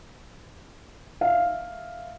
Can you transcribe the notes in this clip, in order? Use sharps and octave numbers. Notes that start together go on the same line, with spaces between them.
E5 F5